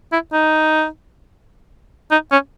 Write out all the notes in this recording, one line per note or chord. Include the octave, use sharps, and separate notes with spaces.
E4
D#4
D#4
C#4